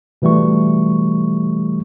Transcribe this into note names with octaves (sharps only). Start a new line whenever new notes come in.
B2 E3 G3 A3 C#6